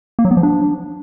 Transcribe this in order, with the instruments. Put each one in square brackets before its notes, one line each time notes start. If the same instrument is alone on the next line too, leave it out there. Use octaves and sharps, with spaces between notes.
[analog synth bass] A#3
F#3
B3
F3
D4